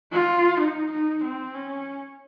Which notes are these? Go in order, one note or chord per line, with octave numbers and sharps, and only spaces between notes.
F4
D#4
D#4
C4
C#4